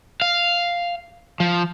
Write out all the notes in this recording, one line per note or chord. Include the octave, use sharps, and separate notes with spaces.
F5
F3